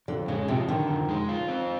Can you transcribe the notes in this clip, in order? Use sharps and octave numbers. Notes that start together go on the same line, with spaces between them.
F2 D3
C#3 G#3
C3 F3
D3 D#3
F2
G#3
F4
C4